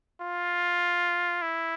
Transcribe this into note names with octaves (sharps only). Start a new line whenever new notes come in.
F4
E4